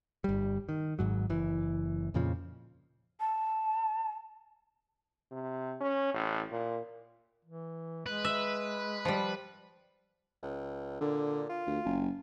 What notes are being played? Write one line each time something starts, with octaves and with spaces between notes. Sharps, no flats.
G1 G3
D#3
G#1 G#2 F#3
F#1 E3
F2 A#2 C#3 F3
A5
C3
C#4
A1
A#2
E3
G#3 B4
E5
F3 G3
C#2
A#2 D3
F4
D2
F#1